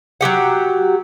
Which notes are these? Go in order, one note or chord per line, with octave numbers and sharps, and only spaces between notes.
F#3 G#3 G4 F#5